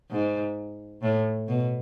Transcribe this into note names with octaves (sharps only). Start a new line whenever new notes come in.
G#2
A2
B2